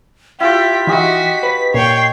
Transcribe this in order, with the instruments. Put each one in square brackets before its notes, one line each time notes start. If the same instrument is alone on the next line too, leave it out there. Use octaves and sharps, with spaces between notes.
[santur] E4 F4 [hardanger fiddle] G4 [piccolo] B6
[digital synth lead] E3 [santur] D#4 G4 D#5 [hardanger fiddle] F#4
[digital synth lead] B4
[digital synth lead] A#2 [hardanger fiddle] C#5 G5 [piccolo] C7